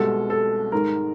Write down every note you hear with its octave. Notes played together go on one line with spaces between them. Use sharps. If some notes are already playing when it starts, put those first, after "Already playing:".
Already playing: C2 B2 G#3 A4
A4
G#2 D#3 G#3 A#4